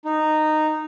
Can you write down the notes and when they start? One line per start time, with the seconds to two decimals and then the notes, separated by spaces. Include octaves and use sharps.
0.05 D#4